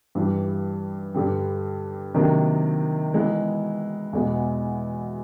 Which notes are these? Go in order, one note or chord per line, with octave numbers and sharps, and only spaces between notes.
G2 E3 G3
G2 D3 G3
C3 D#3 F#3 A#3 D4
E3 G#3 B3 E4
E2 B2 G#3 B3